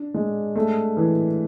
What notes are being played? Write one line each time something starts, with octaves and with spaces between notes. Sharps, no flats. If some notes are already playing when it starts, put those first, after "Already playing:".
Already playing: D4
G#3
A3
E3